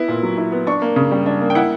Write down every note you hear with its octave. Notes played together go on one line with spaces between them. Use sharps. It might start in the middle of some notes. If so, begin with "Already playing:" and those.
Already playing: B3 E4
A#2
F#3
E4
B3
D4 C#6
A#3
C#3
G3
D4
A#3
G5
E4 F#5